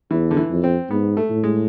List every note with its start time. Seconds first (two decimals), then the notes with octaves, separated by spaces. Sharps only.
0.11 E2 E3
0.31 D3
0.37 E3
0.51 F2
0.64 C4
0.90 G#2 B3
1.17 A3
1.30 A2
1.44 G#3